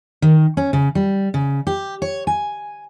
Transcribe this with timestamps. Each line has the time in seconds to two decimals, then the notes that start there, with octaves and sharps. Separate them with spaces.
0.22 D#3
0.57 C#4
0.73 C#3
0.95 G3
1.34 C#3
1.67 G4
2.02 C#5
2.27 G#5